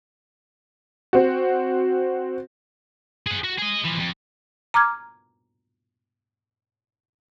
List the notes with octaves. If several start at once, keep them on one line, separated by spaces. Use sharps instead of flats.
C4 F#4
G#4 F#5
F#4
G#4 D#5
E3 F3
F2
A#5 D6 F6 G#6